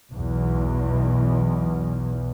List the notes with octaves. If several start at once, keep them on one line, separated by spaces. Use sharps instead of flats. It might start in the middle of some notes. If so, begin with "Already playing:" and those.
B1 E2 B2